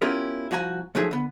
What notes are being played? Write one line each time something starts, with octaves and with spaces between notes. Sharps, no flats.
B3 C#4 E4 F4 G4 A#4
C2 F3 F#4 G#5 A#5
C3 F3 F#3 A3 D#4 G#4
D3 B3